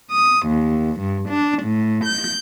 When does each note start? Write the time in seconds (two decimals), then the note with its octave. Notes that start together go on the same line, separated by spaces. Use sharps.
0.11 D#6
0.47 D#2
0.99 G2
1.29 D4
1.64 A2
2.06 G6